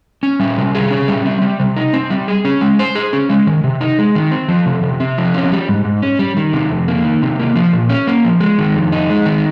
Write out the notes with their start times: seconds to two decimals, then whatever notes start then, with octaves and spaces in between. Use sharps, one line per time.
0.23 C#4
0.40 G3
0.57 C3
0.75 G#4
0.91 C#4
1.08 G3
1.25 C4
1.42 G3
1.60 C3
1.76 D#4
1.93 C4
2.10 G3
2.28 G#4
2.45 C#4
2.61 G#3
2.79 C5
2.95 G#4
3.13 C#4
3.29 G#3
3.47 D#3
3.64 C3
3.81 D#4
3.99 G#3
4.15 D#3
4.31 C4
4.48 F3
4.66 C3
4.83 C3
5.00 C4
5.18 F3
5.34 C#4
5.52 G3
5.68 G#2
5.85 G#2
6.02 C#4
6.19 G3
6.37 D#3
6.53 C3
6.70 F2
6.88 A#3
7.04 D#3
7.22 C3
7.39 A#3
7.56 F3
7.73 A#2
7.89 C#4
8.07 A#3
8.25 F3
8.40 G#3
8.58 D#3
8.75 F2
8.92 D#4
9.10 G#3
9.26 D#3